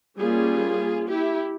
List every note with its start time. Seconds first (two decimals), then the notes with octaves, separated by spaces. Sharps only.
0.18 G3 A#3 C#4 F4 G#4
1.09 E4 G4